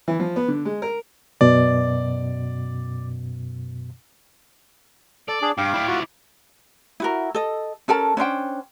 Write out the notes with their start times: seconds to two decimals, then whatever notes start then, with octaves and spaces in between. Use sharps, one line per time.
0.08 E3
0.20 F3
0.36 B3
0.48 D3
0.65 G#3
0.82 A#4
1.41 F#2 B2 D5
5.28 A4 D5
5.42 D4 G#4
5.58 G2 F5 G5 D6
5.74 E4 D5
5.88 F4 F#4
7.00 E4 F#4 A#4
7.35 A4 D#5
7.88 C#4 A4 A#4 A5
8.17 C#4 D4 C5 G5